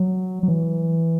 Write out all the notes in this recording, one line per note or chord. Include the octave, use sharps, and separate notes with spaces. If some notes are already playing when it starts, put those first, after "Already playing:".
Already playing: F#3
F#3
E3